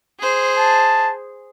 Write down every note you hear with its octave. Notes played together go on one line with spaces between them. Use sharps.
G#4 C5
A5